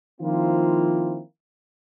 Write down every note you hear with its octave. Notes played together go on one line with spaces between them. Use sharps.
D#3 F3 A#3 C4 E4 F4